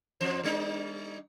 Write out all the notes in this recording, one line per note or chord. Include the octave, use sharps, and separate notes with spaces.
E2 F3 C5
G3 D4 D#4